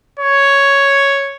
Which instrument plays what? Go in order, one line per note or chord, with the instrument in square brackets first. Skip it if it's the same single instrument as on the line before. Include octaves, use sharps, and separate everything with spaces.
[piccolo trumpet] C#5